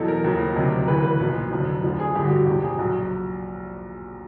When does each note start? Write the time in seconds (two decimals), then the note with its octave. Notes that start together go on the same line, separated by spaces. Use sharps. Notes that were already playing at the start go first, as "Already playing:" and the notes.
Already playing: E2 B2 F#3 A4
0.08 A#4
0.24 D#2 C#3 F3
0.55 D2 C3 D#3 F#3
0.87 D2 C#3 E3 B4
1.03 B4
1.20 B1 A#2 F3
1.51 F1 F2 D3 F#3
1.84 D2 D3 F3
2.00 G#4
2.15 A1 G2 D3 G4
2.25 F#4
2.36 F#4
2.47 E1 D#2 C#3 F3 G4
2.62 G#4
2.78 A#1 A#2 F#3 F#4